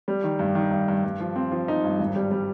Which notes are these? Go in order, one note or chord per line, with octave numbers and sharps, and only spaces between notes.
G3
D#3
G2
D#3
G2
G2
G2
F3
C4
F3
D#4
G2
G#1
G3
G3